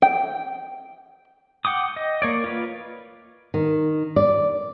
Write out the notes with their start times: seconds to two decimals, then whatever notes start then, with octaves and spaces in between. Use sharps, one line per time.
0.02 G5
1.65 F#5 G5 D6 D#6
1.96 D#5
2.22 A#3 C#5 D5
2.44 F4 B4
3.54 D#3
4.16 D5